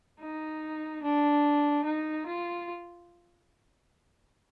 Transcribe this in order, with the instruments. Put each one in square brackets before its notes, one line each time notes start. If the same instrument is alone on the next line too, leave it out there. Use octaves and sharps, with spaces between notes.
[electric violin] D#4
D4
D#4
F4